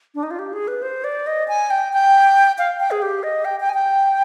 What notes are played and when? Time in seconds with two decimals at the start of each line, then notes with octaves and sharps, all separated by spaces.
0.15 D4
0.23 D#4
0.31 F4
0.39 G4
0.53 G#4
0.68 B4
0.82 C5
1.04 D5
1.27 D#5
1.48 G#5
1.70 G5
1.93 G5
2.58 F5
2.80 G5
2.91 G#4
3.02 G4
3.23 D#5
3.45 G5
3.60 G5
3.69 G#5
3.74 G5